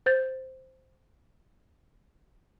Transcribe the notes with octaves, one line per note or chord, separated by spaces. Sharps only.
C5 G6 A6